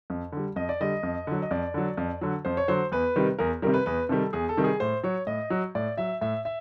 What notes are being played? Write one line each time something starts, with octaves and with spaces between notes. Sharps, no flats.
F2
D3 G3
F2 D#5
D5
D3 G3 D#5
F2
D3 F#3
D#5
F2 D5
D3 F#3
F2
D3 F#3
F2 C5
C#5
D3 F#3 C5
E2 B4
C3 D#3 G3
E2 A#4
C3 D#3 G3 A#4
B4
E2 B4
C3 D#3 G3 A4
E2 G#4
A4
C3 D#3 G3
G#4
A2 C5
F#3 C#5
A2 D#5
F#3
A2 D5
F#3 E5
A2 E5
E5